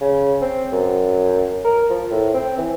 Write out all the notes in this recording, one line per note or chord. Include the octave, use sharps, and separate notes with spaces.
C#3
C4
F#2
A#4
F3
A2
C4
E3